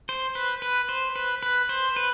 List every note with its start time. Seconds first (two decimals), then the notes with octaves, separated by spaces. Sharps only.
0.09 C5
0.35 B4
0.62 B4
0.89 C5
1.16 B4
1.43 B4
1.69 C5
1.96 B4